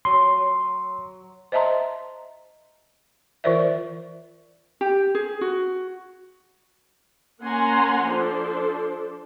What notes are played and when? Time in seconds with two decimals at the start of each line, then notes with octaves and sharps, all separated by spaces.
0.05 F#3 C6 C#6
1.52 C5 D#5 E5 A5 A#5 C6
3.44 E3 F4 A#4 C5 D5 E5
4.81 G4
5.15 G#4
5.41 F#4
7.43 A#3 C#4 F#5 G#5 A#5 C6
8.06 F3 D4 A4 C5